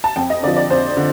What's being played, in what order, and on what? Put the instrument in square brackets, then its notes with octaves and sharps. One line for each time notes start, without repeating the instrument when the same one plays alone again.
[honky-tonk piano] A5
F2 G5
D#5
D3 D5
F3
D5
F2 C5
D3